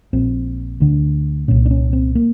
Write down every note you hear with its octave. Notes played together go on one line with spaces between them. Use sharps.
A#1 A#2 C4
D2 D3
C2 A#2 C#4
D4
C#4
C4
A#3